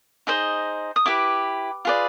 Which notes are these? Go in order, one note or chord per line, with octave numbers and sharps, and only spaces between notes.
D#4 G#4 C5 D#5
D#6
E4 G4 B4 D6
F4 G#4 B4 D5